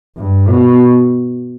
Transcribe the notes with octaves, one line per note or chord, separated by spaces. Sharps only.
G2
B2